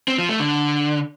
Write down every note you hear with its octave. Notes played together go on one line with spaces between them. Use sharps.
C4
F3
A3
D3